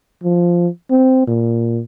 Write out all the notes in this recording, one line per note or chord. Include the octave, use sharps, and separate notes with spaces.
F3
C4
A#2